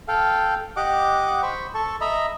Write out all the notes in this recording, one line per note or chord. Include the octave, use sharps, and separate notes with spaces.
A4 F5 G5
G4 D#5 F#5 D6
C5 B5 C#6
A4 A5 C#6
D#5 E5 A#5 B5